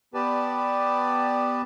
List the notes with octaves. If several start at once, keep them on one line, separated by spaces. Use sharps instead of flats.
B3 G4 B4 D5 A5